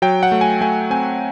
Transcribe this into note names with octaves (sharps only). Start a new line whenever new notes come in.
F#3 G5
F#5
A3
G#5
A3 G#5
C4 G#5